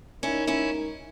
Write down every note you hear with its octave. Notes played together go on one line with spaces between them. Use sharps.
G#3 C#4 D#4 E4 A#4
C#4 E4